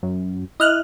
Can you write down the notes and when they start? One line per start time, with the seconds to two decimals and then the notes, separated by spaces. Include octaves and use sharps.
0.03 F#2
0.60 E4 D#5 F6 F#6